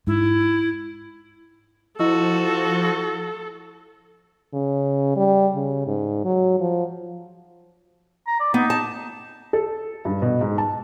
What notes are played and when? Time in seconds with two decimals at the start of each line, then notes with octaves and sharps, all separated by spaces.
0.07 G#2 E4
1.99 F3 E4 F#4 A4 D#5 E6
4.53 C#3
5.16 G3
5.55 C#3
5.87 G#2
6.25 F#3
6.60 F3
8.27 A#5
8.40 D5
8.54 B3 D#4
8.70 A5
9.53 A4
10.05 G2
10.22 B2
10.41 G#2
10.58 A5